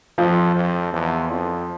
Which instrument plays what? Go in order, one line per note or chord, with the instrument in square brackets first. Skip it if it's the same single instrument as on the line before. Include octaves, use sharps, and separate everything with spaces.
[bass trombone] F2 [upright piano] F3
[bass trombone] F2
E2
F2